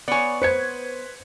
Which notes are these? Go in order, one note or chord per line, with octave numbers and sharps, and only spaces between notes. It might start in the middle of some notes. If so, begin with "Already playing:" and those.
B3 C#5 D5 G#5
B4 C5 G#6 C#7